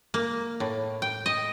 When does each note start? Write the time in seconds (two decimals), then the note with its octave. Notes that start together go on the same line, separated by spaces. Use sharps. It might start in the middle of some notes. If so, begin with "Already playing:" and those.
0.14 A#3
0.60 A2
1.02 G5
1.26 D#5